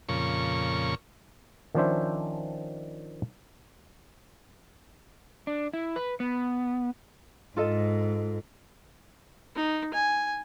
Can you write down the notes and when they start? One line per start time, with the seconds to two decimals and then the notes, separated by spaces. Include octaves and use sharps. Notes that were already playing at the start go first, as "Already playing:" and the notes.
0.09 F2 A#2 C#3 C#6
1.75 D#3 F3 C#4 D4 C5 E5
5.47 D4
5.73 E4
5.96 B4
6.20 B3
7.56 G#2 F4 A4 D#5
9.56 D#4
9.94 G#5